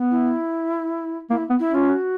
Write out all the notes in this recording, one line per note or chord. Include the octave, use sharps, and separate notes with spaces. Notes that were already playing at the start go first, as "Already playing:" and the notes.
Already playing: B3
E4
A#3 E4
B3
E4
C#4
F4
F#4